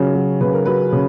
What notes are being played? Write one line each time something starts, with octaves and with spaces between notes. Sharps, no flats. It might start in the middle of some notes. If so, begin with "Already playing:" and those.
Already playing: C#3 F#3
F#3
C#3 B4
A#4
F#3 B4
C#3